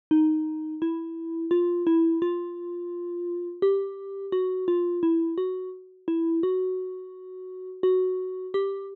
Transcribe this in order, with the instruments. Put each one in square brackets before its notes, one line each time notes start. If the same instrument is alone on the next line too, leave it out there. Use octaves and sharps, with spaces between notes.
[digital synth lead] D#4
E4
F4
E4
F4
G4
F#4
F4
E4
F#4
E4
F#4
F#4
G4